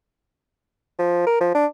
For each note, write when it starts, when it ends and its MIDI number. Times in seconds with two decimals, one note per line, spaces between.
0.99 1.25 53
1.27 1.40 70
1.40 1.53 53
1.55 1.66 62